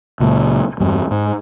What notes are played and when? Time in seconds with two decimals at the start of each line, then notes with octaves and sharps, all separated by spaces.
0.20 C#2 A#2
0.80 E2 G2 G3
1.11 G#2